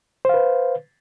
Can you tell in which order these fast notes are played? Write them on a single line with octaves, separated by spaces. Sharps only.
C5 F5 B4